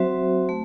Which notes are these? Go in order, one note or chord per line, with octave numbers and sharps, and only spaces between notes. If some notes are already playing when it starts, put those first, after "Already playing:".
Already playing: F#3 C4 F#4 C5 E5
A3